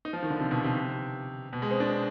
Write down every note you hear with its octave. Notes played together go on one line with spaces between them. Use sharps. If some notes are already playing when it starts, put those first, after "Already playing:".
D#4
F3
D#3
D3
C3
B2
C3
B2
G#3
C4
D4